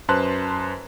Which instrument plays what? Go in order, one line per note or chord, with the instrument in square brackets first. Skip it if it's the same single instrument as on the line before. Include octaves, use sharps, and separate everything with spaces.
[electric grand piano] F#2 B4 C5 A5 C6 F#6